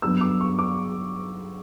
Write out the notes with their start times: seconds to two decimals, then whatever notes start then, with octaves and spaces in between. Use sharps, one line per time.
0.02 G2 F#3 B3 E6
0.21 D6
0.41 C#6
0.59 D6